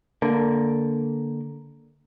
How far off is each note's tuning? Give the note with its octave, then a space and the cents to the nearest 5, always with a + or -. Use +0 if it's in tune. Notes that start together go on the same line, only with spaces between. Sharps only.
D3 -10 A#3 +0